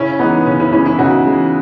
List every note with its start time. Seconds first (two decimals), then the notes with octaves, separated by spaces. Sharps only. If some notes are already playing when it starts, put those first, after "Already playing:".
Already playing: C#3 C#4 E4
0.19 E3 G#3 B3 D#4
0.46 C#3 C#4
0.60 C#4 E4
0.72 E3 G#3 C#4 E4
0.86 C#4 E4
0.99 C#3 D#4 F#4
1.26 E3 G#3